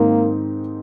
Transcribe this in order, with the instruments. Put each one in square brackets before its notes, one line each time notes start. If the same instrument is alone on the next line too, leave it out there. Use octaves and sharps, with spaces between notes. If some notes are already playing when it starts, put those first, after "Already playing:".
Already playing: [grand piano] G#2 D#3 C4 D#4 [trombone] A#3